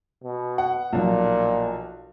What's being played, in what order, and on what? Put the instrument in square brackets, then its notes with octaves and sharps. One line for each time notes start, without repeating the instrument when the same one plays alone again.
[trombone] B2
[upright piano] F#5
[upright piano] B1 F3 [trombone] A#2